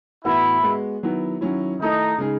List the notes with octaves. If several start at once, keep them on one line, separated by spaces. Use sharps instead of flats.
A2 E3 B3 E4 F#4
G#3 B3 F#4
D#3 F#3 B3 E4
D#3 F#3 C#4 E4
D#3 A3 D#4 E4
C#3 G#3 D#4 G#4